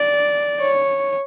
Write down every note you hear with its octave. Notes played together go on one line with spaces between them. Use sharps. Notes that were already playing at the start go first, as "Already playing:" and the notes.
Already playing: D5
C#5